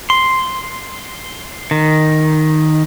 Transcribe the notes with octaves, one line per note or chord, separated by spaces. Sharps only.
C6
D#3